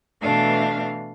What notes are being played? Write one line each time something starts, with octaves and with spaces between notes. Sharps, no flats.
B2 E3 A3 D4 F5